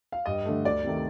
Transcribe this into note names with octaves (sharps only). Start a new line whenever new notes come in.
F5
G2 D#5
D3 A3
D2 D5
C3 D#3 A3